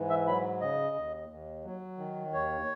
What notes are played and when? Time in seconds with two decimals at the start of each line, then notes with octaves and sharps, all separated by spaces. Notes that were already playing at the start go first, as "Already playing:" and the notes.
Already playing: G#2 E3
0.10 E5
0.26 F#3 B5
0.61 C#3 D#5
0.96 D#2
1.29 D#2
1.65 F#3
1.98 D#3
2.32 D#2 C#5